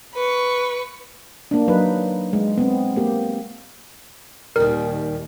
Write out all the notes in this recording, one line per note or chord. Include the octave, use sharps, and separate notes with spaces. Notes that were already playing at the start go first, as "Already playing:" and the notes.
B4 C#6
A#3 D4
F#3 D#4 B4
G#3
B3 C4
A#3 G4
D#2 A#2 D#3 G3 A#4